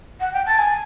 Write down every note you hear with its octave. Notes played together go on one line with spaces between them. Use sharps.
F#5
G5
A5
G#5